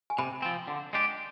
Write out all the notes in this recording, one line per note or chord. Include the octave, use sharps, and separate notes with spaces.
G#5
C3 G5 B5
F3 C4
D3
G#3 D4 G4